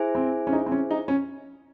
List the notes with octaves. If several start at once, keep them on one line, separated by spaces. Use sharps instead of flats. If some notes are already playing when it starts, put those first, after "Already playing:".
Already playing: E4 G#4 C5 E5 G#5
C4
C#4
D#4
C4
C#4
D#4
C#4